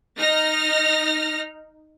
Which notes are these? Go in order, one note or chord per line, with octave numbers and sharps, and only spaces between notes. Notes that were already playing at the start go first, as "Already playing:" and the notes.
D#4 F6 A#6